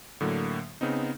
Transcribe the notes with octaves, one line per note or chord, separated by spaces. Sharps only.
A2 D3 F#3 A#3
C#3 B3 C4 D#4